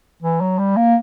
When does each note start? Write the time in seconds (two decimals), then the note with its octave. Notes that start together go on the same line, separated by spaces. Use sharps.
0.22 E3
0.41 F#3
0.59 G3
0.77 A#3